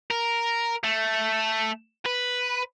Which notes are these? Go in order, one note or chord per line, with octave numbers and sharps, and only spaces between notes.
A#4
A3
B4